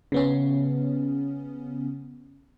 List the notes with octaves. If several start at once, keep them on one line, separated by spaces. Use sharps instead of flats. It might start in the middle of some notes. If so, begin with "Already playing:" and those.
C#3 B3 C#4